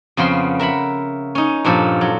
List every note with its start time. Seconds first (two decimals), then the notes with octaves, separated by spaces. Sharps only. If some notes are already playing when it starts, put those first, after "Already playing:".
0.17 F2 C#3 B3 C4 C6
0.59 A#4 E5 F#5 B5
1.35 C#4 D#4
1.65 G2 A#2 F3 A4
2.01 F#3